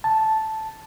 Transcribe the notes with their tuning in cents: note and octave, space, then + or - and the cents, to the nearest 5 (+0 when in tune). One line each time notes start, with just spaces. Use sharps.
A5 -5